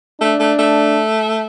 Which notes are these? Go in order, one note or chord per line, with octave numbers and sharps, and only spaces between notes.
A3 D4
A3
A3